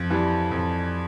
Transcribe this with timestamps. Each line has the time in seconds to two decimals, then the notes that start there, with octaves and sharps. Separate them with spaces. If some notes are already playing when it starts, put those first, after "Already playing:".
Already playing: F2
0.10 E3 G3
0.51 F2